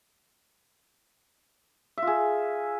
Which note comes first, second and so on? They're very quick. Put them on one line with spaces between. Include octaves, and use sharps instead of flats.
E5 F4 G#4